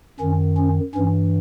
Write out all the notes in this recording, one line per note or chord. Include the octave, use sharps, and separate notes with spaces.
F#2 D#3 C#4
C#4
G2 E3 C#4